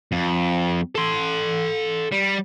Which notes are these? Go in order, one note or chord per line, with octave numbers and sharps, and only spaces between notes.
F2
A4 C6
G3